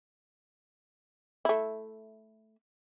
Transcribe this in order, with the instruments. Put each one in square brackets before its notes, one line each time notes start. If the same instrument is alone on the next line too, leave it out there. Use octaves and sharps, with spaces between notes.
[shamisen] A3 E4